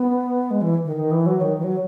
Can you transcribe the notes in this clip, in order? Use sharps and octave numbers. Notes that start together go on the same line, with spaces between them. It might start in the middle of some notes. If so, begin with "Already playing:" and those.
Already playing: B3
G#3
E3
D#3
D#3
E3
F#3
D#3
E3
F#3